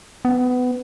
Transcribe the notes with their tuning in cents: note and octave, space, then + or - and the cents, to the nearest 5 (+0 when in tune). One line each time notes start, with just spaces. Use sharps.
B3 +20